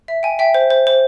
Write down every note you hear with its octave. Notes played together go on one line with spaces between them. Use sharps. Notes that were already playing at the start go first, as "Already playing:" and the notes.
E5
G5 G#5
E5 G5
C5
C5
C5